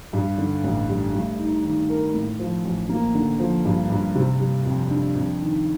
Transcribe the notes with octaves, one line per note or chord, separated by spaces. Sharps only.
G2
D3
A1
G3
A3
D#4
D#3
A#4
A2
F3
A1
A#3
D3
F3
G2
G2
C3
G3
F2
D4
F2
D#3